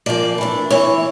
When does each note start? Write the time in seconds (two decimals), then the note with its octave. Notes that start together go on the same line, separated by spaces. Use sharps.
0.06 A#2 F3 A#3 D5
0.38 E3 A3 D4
0.70 E3 A#3 E4 C#5